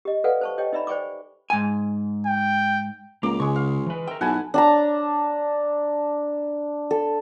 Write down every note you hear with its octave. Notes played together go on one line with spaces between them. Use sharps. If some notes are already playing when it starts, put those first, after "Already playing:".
G4 D#5
A4 B4 D5 F5 F#5 G#5
C5 A5 C#6
G4 C#5 D#5 G5
D#4 D5 E5 A#5 B5
C5 D5 G5 G#5 C#6 D6
G#2 G#5
G5
C#2 A#3 A#4 D6
C#3 G#3 C#6
F5
E3 B4
A#4 E5 G5
B1 E4 F#4 A4 F#5 G#5 A5
D4 A5 A#5
A4